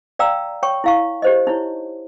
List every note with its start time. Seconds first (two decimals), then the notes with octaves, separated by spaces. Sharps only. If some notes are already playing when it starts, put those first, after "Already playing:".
0.19 D5 F5 G5 A#5 E6
0.63 C#5 G5 C#6
0.84 E4 F5 C#6
1.22 G4 C5 D#5
1.47 D#4 E4 C#5